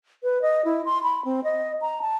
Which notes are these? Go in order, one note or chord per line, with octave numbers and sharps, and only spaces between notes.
B4
D#5
E4
C6
B5
C4
D#5
A#5
A5